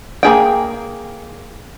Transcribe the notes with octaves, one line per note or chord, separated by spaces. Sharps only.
A#3 G#4 G5